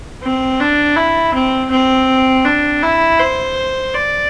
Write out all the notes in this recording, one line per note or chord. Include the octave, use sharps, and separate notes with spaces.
C4
D4
E4
C4
C4
D4
E4
C5
D5